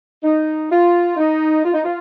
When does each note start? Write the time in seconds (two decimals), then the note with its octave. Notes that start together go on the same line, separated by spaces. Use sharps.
0.23 D#4
0.70 F4
1.16 D#4
1.64 F4
1.74 D#4
1.84 F4